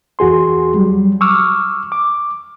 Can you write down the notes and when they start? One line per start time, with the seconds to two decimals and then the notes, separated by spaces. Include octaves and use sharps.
0.19 E2 F#4 G#4 C6
0.74 F#3 G3
1.21 C#6 D6 E6 F6
1.92 D6